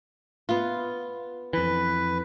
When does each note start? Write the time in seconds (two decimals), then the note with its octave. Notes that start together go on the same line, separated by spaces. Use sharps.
0.49 B3 F4
1.53 F2 E3 B4